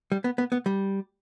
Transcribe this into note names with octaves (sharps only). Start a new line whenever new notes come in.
G3
B3
B3
B3
G3